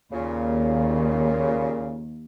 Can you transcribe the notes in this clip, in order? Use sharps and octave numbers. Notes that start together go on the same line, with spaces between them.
D#2 A#2 C#3